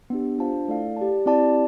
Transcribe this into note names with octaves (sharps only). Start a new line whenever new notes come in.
B3 D4 G4
D4 F4 C5 F5 A5
A3 E4 A4 D5 F5
G4 D5 A5
C4 E4 G4 D5 A5